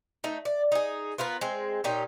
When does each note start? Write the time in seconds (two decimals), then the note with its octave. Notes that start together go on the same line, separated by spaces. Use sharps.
0.24 A3 D#4
0.45 D5
0.72 D#4 G#4
1.18 B3 F4 A#4 B4
1.41 G#3 C4
1.84 A#2 C#4 D#4 G4